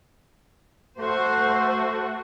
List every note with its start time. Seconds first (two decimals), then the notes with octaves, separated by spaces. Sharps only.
0.99 A3 F#4 C5